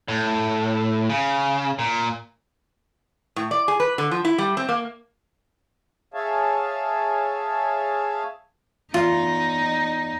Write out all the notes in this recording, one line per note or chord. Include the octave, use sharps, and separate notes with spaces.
A2
C#3
A#2
A2
D5
G#4
B4
D3
F3
E4
G3
C4
A#3
G#4 C#5 E5 F5 G#5 A5
E2 D#4 F4